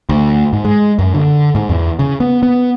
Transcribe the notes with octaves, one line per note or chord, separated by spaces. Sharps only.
D2
G#2
G#3
F#2
D3
G#2
E2
C#3
B3
B3